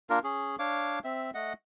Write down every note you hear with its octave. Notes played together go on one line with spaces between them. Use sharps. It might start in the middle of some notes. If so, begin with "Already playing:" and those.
A#3 D4 F4 A#4
C#4 G#4
D4 C#5 F5 D6
C4 E5
A3 D#5 F#5